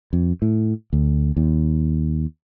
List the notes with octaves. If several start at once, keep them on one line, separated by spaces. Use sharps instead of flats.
F2
A2
D2
D#2